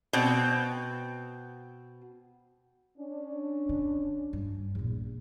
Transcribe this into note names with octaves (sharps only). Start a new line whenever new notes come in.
B2 C4
C#4 D4
D3
G2
A#1 E2